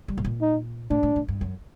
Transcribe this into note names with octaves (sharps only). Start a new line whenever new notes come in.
G3
A2
A#2
D#4
A2 D4
A2
A2
G2
F#2